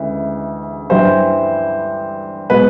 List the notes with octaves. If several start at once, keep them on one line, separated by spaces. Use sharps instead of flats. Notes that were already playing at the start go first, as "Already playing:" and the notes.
Already playing: D2 C#3 E3 G#3
G2 E3 G3 C5
B2 G#3 B4